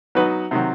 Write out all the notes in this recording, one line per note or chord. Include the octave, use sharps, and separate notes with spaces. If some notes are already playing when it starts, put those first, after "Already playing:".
F#3 B3 D#4 F#4 B4
C3 D#3 F#3